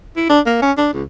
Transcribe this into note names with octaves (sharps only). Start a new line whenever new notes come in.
E4
D4
A#3
C#4
D4
C#2